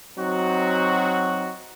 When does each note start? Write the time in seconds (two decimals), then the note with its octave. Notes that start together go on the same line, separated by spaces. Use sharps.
0.18 F#3 C4 D#4 F#4